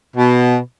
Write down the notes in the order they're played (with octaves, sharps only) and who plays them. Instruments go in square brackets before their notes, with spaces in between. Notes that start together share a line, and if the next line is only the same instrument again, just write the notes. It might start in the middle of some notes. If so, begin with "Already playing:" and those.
[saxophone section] B2